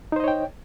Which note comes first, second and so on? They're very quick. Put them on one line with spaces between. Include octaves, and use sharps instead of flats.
D#4 C5 D#5 C#5 G5